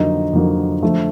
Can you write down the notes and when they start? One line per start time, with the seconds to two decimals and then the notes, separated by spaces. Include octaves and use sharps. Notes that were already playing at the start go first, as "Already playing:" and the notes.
Already playing: F2 D3 F#3 A#3 D#4
0.33 F2 D3 F#3 A#3 D#4
0.82 D3 F3 A3